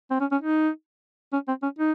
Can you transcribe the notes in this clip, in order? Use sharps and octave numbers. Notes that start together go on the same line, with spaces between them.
C4
C#4
C#4
D#4
C#4
C4
C#4
D#4